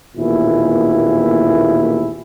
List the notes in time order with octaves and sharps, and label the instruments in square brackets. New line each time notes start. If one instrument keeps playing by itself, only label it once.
[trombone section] A1 D#2 A#2 B3 E4 G#4